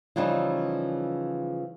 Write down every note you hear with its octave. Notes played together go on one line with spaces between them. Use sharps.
C#3 E3 F3 G3 D#4